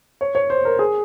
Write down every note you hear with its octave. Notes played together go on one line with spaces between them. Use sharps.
C#5
C#5
C5
A#4
G#4